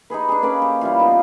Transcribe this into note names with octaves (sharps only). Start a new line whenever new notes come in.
D#4 G4 G#4 B4
D4 G#4
A#3 C#4 B4 D5
G4
G3 E4 F4
F3 B3 D#4